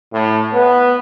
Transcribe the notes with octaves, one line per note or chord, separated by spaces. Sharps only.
A2
B3